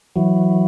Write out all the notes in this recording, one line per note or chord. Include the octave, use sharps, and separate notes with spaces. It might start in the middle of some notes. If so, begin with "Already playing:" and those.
E3 F#3